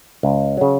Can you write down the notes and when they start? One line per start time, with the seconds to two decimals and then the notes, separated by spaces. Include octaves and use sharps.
0.23 C#2
0.57 C#3 F#3